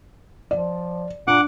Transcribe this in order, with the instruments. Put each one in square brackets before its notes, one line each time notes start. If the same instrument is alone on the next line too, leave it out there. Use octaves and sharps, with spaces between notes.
[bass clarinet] F3 [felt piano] D5
[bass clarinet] A#2 [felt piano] D4 [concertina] F#5 D6